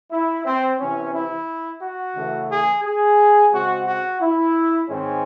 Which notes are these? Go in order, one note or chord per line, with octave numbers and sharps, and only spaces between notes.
E4
C4
C3 E3 C4 C#4
E4
F#4
C#3 E3 A3
G#4
G#4
C#3 G#3 C4 F#4
F#4
E4
G#2 D#3 G#3 C4 C#4